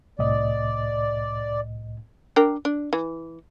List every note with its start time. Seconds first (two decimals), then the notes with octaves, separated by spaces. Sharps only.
0.19 C2 A2 D5 D#5
2.36 D4 A#4 G5
2.65 D4
2.93 E3